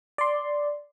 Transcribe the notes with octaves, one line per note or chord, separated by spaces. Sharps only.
D5 C6